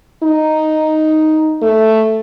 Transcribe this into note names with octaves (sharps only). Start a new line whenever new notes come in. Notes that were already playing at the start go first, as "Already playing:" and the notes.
D#4
A3